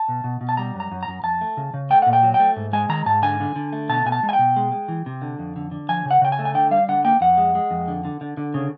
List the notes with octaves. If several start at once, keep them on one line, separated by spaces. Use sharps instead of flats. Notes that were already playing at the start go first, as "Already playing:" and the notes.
Already playing: A5
B2
B2
B2
A5
G3 A#5
F#2
A#5
F#2
A#5
F#2
F2 A5
A3
C#3
C#3
A3 G5
A#2 F#5
G5
F#3
G5
A3
G#2
G#3 G#5
D#3 A#5
G#2 A5
D3 G#5
D3
D3
A3
B2 A5
B2 G#5
A5
G#3
G#5
G5
B2
G#3
G#3
E3
C3
D3
F2
D3
D3
F3 G#5
C#3
F#5
C#3 G5
G#5
A3
G#5
D3 G5
G3 F5
D3 F#5
A#3 G5
F2 F#5
G#3
G#3
F2
D3
D3
D3
D3
C#3